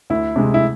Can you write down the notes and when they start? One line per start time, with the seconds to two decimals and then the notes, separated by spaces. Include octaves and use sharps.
0.10 D2 E4
0.36 C3 G#3
0.54 E4